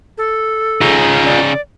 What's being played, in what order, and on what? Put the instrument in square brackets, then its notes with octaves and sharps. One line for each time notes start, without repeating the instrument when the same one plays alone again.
[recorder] A4
[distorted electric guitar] C#3 D#4 [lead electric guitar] F4 G#4
[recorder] D5